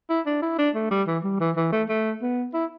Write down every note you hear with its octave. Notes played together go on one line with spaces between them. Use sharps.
E4
D4
E4
D4
A3
G3
E3
G3
E3
E3
A3
A3
B3
E4